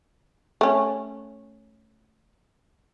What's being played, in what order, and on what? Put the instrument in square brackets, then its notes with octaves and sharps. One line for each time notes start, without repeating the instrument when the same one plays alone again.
[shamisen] A3 C#4